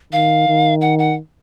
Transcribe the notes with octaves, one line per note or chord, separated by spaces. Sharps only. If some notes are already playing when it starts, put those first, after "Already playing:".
D#3 F5
D#3
F#5
F#5